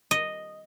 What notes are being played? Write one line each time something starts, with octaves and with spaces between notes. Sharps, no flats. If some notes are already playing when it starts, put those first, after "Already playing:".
D#5